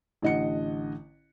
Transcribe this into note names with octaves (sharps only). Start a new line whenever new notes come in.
A1 D3 D#5 F#5 C#7